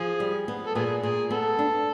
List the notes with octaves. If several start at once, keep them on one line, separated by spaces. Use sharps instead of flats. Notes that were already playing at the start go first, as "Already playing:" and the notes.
Already playing: F3 G#4
G3
B3
A4
A#2 B3 G#4
A#2 G#4
B3 A4
D4